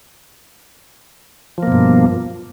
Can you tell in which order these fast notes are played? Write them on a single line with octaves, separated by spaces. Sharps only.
F3 A#3 B2 G2